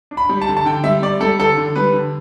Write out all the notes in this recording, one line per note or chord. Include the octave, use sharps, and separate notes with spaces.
D4
B5
G3
A5
D3
A5
D3 G5
G3 E5
G3 D5
G3 A4
D3 A4
D3
G3 B4
D3